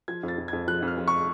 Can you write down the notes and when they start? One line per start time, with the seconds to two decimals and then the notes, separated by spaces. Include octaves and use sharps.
0.08 F3 G#6
0.23 F2
0.28 A6
0.38 F2
0.48 F2 G#6
0.68 F3 F#6
0.82 F2
0.88 F6
0.98 F3
1.08 C#6